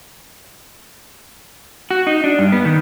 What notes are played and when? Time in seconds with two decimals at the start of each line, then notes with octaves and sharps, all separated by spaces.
1.91 F#4
2.07 D#4
2.24 D4
2.39 G2
2.52 B3
2.65 D#3